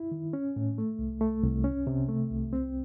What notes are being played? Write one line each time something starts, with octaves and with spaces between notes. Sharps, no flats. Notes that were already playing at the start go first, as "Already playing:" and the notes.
Already playing: E4
D#3
C#4
A2
A3
C2
A3
C2
C#4
C3
A3
C2
C4